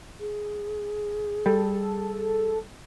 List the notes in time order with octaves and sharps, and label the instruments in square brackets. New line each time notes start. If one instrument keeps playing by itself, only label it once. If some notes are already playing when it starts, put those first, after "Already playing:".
[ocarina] G#4
[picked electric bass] G3 [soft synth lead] A4